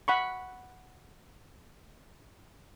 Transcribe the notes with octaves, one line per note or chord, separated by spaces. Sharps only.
F#5 B5 C#6